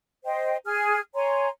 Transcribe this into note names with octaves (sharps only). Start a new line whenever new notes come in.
C5 D#5 G5
G#4 G#5 F6
C#5 G#5 A#5 C6